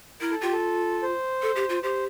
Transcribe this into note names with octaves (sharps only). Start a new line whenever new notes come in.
E4 A#4
A4
F4 G4
A4
C5
A4
G4
F4
G4 C5